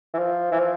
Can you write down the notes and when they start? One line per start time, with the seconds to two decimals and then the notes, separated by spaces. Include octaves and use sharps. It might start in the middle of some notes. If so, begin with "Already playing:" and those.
0.13 E3
0.18 F3
0.52 E3
0.59 F3